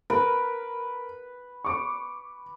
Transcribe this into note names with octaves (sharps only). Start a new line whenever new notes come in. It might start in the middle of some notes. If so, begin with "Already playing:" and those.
A#4 B4
C#6 D6